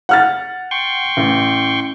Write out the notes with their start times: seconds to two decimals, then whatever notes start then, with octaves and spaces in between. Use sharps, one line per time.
0.09 F#5 F6 A6
0.71 G5 C6 C#6
1.17 A1